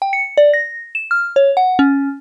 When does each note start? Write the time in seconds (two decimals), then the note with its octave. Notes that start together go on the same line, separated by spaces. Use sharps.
0.02 G5
0.13 C#7
0.37 D5
0.54 A#6
0.95 E7
1.11 F6
1.36 C#5
1.57 F#5
1.79 C#4